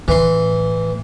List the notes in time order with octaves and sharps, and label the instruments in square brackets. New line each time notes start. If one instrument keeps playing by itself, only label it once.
[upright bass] A2 [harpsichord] E3 C6